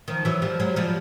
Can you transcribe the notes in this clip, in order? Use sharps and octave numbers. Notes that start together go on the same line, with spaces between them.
D#3 F3
E3 F#3
F3 G3
F#3 G#3
F3 G3